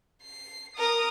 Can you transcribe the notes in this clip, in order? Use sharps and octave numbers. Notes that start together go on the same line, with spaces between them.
C7
A#4 D#6